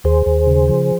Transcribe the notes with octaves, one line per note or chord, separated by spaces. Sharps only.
D#2 G#4 C5
D#2
C#3
F3